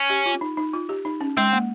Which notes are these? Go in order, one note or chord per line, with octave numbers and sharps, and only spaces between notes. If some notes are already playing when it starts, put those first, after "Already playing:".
Already playing: C#4
G4
F4
D#4
D#4
F4
G4
D#4
C#4
G#3 C4
A#3